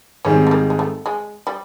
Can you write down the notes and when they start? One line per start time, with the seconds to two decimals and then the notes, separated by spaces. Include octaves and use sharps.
0.25 G#2 D#3 G3 C4 C#4
0.47 A3
0.51 A#3
0.70 G#3
0.79 A3
1.06 G#3
1.47 G3